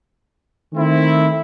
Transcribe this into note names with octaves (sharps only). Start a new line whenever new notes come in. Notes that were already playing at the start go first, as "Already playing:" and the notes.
D#3 A3 C4 E4